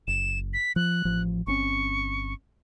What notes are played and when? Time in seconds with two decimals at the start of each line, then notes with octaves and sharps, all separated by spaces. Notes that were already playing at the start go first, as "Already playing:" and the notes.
0.07 F#1 E7
0.54 B6
0.76 F3 F#6
1.05 A1 F3
1.47 G1 C4 C#4 C#6